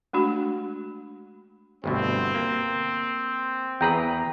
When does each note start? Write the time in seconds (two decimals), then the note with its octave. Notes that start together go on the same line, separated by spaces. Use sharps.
0.13 G#3 A3 D4 F#4
1.84 G1 D2 B2 C4
2.35 A#3
3.81 E2 G#4 B4 G5 A#5